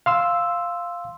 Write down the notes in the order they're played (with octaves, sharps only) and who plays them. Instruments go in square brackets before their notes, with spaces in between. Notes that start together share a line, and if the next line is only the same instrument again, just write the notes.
[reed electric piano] F5 C6 E6